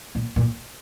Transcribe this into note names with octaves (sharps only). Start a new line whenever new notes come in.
A#2
A#2